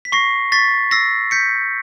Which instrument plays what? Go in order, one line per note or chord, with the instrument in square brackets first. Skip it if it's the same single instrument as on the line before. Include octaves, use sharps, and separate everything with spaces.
[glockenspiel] B6
C#6 A#6 C7
C#6 A6 B6
E6 A#6 C7
G6 B6 C#7